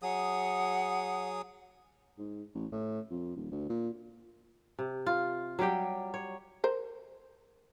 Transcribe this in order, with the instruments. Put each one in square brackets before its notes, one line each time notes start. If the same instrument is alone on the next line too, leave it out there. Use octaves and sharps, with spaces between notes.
[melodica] F#3 G#4 D#6 [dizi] F#5
[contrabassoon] G#2
A1
A2
F2
D#1
D2
A#2
[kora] C3
F4
F#3 G3 G4 G5
C#5
[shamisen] A#4 C5